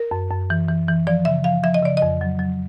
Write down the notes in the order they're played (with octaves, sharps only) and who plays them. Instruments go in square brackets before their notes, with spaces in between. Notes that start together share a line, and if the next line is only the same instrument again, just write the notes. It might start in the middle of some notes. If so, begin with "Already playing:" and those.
Already playing: [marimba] A#4
F#2
F#2
E3
E3
E3
F3 D5
C#3 E5
F3 F5
F3 E5
D#5
C#3 D5
F2 D#5
F#3
F#3